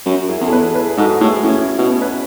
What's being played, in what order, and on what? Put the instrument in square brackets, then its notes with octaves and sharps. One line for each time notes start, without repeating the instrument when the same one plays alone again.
[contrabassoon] F#2
[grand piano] E4 G#4
[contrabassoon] E2 [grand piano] A4
[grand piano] G#4 B4
G#4 B4
[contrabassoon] G#2 [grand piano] F#4 A4
[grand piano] F#4
[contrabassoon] A2 [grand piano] E4 G#4
[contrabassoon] A2 [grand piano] C#4 E4
[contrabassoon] B2
[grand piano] B4